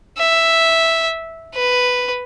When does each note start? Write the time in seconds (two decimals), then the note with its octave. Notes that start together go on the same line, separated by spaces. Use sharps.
0.18 E5
1.55 B4